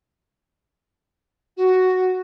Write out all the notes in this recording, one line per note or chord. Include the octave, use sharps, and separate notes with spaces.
F#4